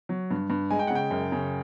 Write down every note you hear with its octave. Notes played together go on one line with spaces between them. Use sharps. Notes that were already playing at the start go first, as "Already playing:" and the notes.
F#3
G2
G2
G#3 G#5
G5
C#3 F#5
G5
F#2
C#3